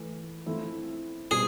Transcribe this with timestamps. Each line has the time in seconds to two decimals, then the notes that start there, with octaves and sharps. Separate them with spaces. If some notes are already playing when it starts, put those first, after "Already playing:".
Already playing: E3 A3
0.46 F3 A3 C4 E4
1.31 B2 G3 C4 G#4